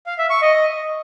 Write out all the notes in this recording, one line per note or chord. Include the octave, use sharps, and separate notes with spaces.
F5
E5
C#6
D#5